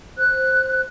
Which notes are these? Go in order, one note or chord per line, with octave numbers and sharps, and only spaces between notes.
C5 F#6